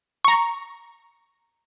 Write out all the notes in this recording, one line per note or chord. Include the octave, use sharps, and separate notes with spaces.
A#5 C#6